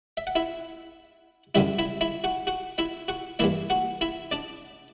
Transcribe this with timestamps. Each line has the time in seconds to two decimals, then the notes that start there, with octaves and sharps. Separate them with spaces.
0.17 E5
0.27 F#5
0.36 E4 E5
1.55 F#2 D3 G3 E4 E5
1.79 E4 E5
2.01 E4 E5
2.24 F#4 F#5
2.47 F#4 F#5
2.78 E4 E5
3.08 F#4 F#5
3.39 G2 E3 A#3 E4 E5
3.70 F#4 F#5
4.01 E4 E5
4.31 D4 D5